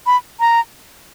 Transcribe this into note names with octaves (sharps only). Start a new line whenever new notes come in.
B5
A#5